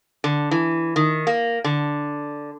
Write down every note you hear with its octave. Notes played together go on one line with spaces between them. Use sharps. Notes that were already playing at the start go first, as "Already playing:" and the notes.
D3
E3
D#3
A#3
D3